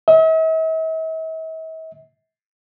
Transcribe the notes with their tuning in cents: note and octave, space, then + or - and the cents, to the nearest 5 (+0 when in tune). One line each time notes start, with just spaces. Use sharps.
E5 -45